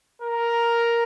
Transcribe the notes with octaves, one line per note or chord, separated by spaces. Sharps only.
A#4